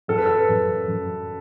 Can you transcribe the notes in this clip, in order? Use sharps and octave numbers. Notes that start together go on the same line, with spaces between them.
F#2 A4
B4
A4
F#2
F#2